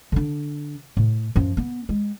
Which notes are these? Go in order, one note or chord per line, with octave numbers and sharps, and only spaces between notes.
D3 D4
A2
F#2 F3
B3
G#3